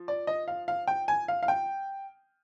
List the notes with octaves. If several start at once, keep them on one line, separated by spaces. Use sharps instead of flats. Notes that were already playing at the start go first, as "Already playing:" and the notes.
Already playing: F3
D5
D#5
F5
F5
G5
G#5
F5
F5
G5